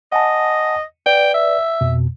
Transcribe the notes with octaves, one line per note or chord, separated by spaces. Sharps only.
D#5 F#5 G#5 A5
B4 D5 G5
E5
F2 B2